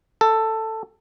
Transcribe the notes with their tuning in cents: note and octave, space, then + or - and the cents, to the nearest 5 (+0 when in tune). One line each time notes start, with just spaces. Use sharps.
A4 +10